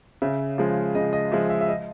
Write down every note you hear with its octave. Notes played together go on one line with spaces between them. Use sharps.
C#3 E5
F3 G#3
C#3 D#5
D#5
F3 G#3 E5
E5
E5
D#5